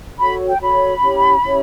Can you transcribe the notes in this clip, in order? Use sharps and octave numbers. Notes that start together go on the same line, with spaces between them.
F#4 A4 C#5 B5
G5
F#4 A4 C#5 B5
C#4 E4 G4 C#5
C#4 E4 G4 C#5